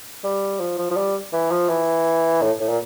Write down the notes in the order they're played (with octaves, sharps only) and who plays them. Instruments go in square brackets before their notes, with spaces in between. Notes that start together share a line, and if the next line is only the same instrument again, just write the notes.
[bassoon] G3
F3
F3
F3
G3
E3
F3
E3
A2
A2
A#2